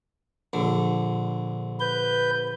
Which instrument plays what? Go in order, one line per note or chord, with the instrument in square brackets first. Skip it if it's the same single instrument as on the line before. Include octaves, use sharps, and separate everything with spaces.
[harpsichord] A#1 D3
[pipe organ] B4 G6